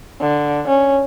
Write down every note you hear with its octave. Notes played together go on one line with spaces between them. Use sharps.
D3
C#4